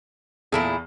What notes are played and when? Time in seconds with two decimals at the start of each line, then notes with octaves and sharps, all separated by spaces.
0.52 E2 A#2 E4 G#4 A4